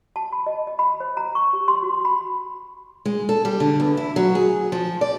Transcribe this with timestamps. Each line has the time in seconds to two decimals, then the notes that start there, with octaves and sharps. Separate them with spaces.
0.16 A5
0.33 B5
0.46 D#5
0.67 D#5
0.79 B5
1.00 C5
1.17 A#5
1.35 C#6
1.53 G4
1.68 C6
1.82 F#4
2.05 B5
3.05 G#3
3.29 A4
3.45 G3
3.60 D3
3.80 E2
3.97 E4
4.16 F#3
4.35 G#4
4.72 F3
5.01 D5